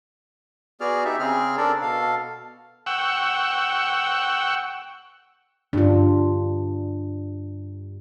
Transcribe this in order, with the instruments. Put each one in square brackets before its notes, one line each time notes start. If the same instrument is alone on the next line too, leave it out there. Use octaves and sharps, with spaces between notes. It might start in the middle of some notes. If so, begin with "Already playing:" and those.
[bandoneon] B3 F#4 G#4 D5 F6
D#4 G4 E5
C#3 C4 G#4 F6
D4 A4 A#4 D5
B2 A4 F5
[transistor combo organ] F#5 G5 C#6 E6
[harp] G2 [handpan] D4 F4